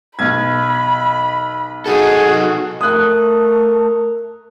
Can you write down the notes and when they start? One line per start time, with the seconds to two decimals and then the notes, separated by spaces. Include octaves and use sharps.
0.19 B1 B5 G#6
1.86 D#4 F#4 G#4 A4
2.81 A3 A#4 D#6 F#6